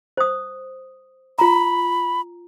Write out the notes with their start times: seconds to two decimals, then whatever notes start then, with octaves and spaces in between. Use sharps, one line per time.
0.17 C5 D#6
1.39 F4 A#5 B5